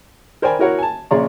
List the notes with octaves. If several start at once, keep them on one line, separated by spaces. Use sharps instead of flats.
A#4 C5 D5 G5 G#5 B5
E4 F#4 A#4 C#5 F#5
G#5 A5
A#1 C#3 C#5 D5 A#5 C6